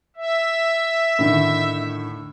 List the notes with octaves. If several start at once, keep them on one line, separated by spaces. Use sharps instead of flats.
E5
A2 D3 D#3